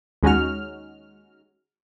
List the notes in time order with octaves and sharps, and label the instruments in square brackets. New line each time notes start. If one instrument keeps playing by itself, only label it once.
[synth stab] D#2 G#3 C#4 D#4 F#4 F6